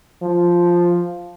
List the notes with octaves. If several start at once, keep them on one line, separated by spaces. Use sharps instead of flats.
F3